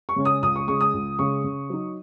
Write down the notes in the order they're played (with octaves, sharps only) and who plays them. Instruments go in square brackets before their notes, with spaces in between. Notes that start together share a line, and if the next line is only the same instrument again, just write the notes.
[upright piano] C#6
C#3 G#3 C#4
D#6
C#2 D#6
C#6
C#3 G#3 C#6
D#6
C#2
C#3 G#3 C#6
C#3
F#3 D#4